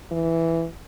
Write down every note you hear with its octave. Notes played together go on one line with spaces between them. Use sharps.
E3